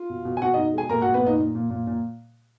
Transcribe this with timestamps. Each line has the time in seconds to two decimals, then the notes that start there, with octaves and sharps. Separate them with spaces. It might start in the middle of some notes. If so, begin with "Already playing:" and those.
Already playing: F4
0.10 B2
0.25 B2
0.37 G#5
0.42 B2 F#4 F#5
0.54 B2 D#4 D#5
0.73 G#3 G#4 G#5
0.89 A#2 A#4 A#5
1.01 A#2 F#4 F#5
1.14 B3 B4
1.22 A#2 D#4
1.38 A#2
1.55 A#2
1.70 A#2
1.87 A#2